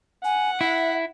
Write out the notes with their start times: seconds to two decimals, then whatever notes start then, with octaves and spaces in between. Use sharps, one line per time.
0.24 F#5 G#5
0.61 E4 E5